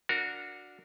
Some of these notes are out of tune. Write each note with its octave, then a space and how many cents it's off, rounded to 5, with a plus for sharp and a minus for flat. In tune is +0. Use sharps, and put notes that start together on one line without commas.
D4 +5 F#4 -20 A#4 +0